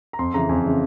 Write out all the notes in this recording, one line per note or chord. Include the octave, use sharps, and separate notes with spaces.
A#5
F2 C6
C#3 E3 A#5
F2 G#5
C#3 E3